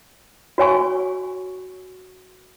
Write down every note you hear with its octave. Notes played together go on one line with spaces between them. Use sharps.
F#4 C#5 G#5 C#6